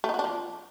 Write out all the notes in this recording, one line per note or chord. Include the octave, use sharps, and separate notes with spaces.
A3
D#4
F#4
D4
F3